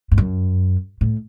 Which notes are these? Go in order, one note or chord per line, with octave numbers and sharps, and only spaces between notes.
G2
F#2
A2